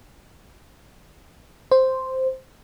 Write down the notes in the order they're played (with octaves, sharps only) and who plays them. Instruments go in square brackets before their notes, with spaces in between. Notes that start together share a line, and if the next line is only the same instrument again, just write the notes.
[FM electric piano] C5